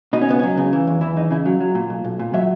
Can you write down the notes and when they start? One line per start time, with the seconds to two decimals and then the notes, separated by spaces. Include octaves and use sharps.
0.13 B2 D#4
0.22 C#4
0.29 C#2 B3
0.39 F#3 C#4
0.58 C#3
0.73 E3
0.87 E2
1.01 E3 E4
1.16 E2 D#4
1.31 C#3 E4
1.46 F#3
1.60 F#3
1.75 A#2
1.90 B1
2.04 B1
2.19 A#2
2.34 F#3 E5